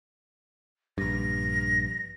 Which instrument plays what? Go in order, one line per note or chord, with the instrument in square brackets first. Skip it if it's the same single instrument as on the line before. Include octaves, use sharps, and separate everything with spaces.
[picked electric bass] A#1 G2 [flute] A#6